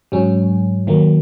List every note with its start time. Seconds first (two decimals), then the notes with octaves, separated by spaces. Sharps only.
0.12 G#2 F#3 C#4
0.87 D#3 F#3 A#3